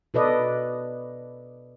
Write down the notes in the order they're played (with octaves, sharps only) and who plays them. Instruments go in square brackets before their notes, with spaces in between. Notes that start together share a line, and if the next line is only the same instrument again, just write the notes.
[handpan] B2 A4 B4 D5 D#5